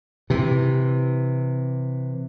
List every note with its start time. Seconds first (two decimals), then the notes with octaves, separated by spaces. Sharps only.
0.30 C3 E3